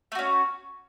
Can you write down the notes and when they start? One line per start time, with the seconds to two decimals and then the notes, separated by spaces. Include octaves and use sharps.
0.12 A3
0.15 F#4
0.19 C#4